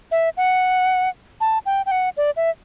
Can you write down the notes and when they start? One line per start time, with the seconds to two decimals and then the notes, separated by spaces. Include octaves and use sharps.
0.11 E5
0.37 F#5
1.41 A5
1.66 G5
1.86 G5
1.91 F#5
2.17 D5
2.37 E5